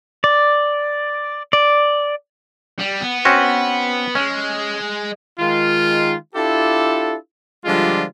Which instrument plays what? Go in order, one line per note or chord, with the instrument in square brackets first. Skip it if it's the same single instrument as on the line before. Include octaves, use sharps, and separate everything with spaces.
[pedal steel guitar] D5
D5
[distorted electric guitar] G3
B3
[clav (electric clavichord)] C4 C#4 F#4
[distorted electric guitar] G#3 [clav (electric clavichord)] C#4
[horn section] D#3 G#3 F4
D4 E4 F4 G4 A4
D3 F3 G3 G#3 D4 F4